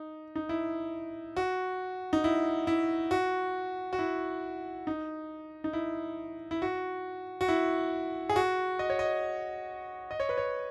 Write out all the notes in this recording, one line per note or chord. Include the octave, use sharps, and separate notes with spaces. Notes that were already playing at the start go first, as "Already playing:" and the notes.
Already playing: D#4
D#4
E4
F#4
D#4
E4
E4
F#4
F#4
E4
D#4
D#4
E4
E4
F#4
F#4
E4
G#4
F#4
D#5
C#5
D#5
D#5
C#5
B4
C#5